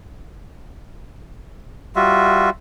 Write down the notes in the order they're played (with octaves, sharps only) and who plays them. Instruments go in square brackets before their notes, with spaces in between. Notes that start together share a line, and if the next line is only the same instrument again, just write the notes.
[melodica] G3 F4 F#4 E5